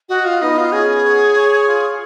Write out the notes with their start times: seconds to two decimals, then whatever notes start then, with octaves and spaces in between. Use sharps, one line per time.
0.09 F#4 D#5
0.25 F4
0.42 B3 D#4
0.58 F4
0.72 C#4 G#4
1.04 C#5
1.36 C#5
1.68 F4